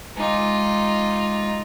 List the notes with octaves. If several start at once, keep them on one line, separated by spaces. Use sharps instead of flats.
G#3 D#4 F4 D6